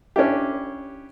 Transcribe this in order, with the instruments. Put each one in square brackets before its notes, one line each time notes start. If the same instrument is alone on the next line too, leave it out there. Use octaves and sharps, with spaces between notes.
[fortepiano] C#4 D4 E4 G4